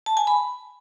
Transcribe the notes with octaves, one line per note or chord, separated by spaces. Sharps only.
A5
G#5
B5